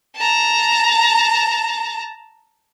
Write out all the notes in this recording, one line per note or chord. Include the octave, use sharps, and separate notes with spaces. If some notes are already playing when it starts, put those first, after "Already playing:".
A5 A#5